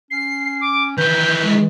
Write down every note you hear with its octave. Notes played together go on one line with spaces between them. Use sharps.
C#4 C7
D6
D#3 E3 B4 G6
G#3